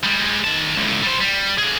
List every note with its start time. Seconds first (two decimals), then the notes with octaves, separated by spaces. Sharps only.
0.04 G3 G#3
0.44 D#3 A5
0.76 C#2 A2
1.02 G3 C5
1.21 G3
1.58 D3 G#4